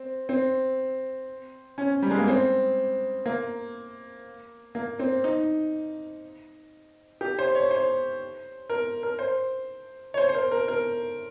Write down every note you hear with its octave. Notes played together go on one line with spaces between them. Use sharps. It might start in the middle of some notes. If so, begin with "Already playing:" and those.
Already playing: C4
C4
C#4
G3
G#3
A#3
C4
A#3
A#3
C4
D#4
G4
C5
C#5
C5
A#4
A#4
C5
C#5
C5
C5
A#4
A#4
A#4